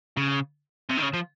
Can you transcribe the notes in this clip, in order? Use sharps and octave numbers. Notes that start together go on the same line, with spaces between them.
C#3
C3
D#3
C#3
F3